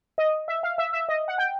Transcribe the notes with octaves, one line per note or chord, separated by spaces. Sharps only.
D#5
E5
F5
E5
E5
D#5
F#5
G5